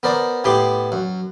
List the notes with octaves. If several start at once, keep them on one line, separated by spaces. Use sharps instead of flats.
B3 A#4 C5 D5
A2 B3 G4 C6 D6
F#2